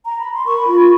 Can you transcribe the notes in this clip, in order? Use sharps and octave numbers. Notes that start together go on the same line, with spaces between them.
A#5
B5
C6
A#4 B5 C#6
F4